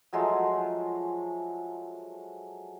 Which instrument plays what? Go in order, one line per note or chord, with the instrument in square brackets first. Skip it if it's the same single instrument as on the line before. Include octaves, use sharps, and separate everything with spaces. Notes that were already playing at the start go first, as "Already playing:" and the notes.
[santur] F3 F#3 G#3 A3